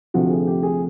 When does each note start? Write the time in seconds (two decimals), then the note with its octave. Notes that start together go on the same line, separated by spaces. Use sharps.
0.14 D2 C3 F3 A3 F#4
0.30 G#4
0.47 G4
0.63 G#4